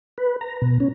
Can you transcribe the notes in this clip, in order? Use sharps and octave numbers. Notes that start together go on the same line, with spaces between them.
B4
A#5
B2
C#4